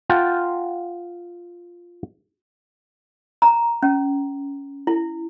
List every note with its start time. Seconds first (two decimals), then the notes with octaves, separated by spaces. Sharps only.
0.10 F4 F#5 G5 A5
3.42 A#5
3.83 C#4
4.87 E4